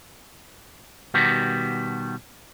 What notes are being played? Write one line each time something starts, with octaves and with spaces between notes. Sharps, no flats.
B2 D#3 G3 B3 F#4 G4